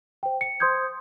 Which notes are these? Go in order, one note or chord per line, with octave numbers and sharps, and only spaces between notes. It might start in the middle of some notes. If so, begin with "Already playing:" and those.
C5 G5
C#7
C5 C6 D#6 G6 G#6